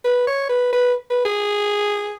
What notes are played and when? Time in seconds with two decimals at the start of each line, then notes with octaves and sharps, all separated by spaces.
0.05 B4
0.28 C#5
0.49 B4
0.73 B4
1.10 B4
1.25 G#4